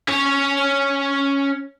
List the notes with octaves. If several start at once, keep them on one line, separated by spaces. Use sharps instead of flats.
C#4 C#5